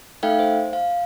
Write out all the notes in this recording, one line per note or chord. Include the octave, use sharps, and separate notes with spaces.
A3 D#4 A4 E5 F5 G5
C5
F5